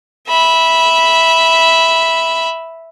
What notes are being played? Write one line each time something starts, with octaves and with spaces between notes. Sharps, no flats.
E5 B5